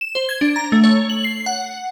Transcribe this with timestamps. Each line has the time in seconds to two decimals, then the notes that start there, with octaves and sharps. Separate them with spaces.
0.01 E7
0.15 C5
0.29 G#6
0.41 D4
0.56 A#5
0.72 A3
0.84 C#5
1.10 F#7
1.24 C7
1.46 F#5